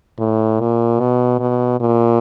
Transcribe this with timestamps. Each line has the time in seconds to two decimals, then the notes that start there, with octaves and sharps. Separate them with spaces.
0.19 A2
0.60 A#2
1.00 B2
1.40 B2
1.80 A#2